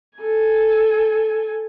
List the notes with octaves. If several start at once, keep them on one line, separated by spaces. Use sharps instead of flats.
A4 G#5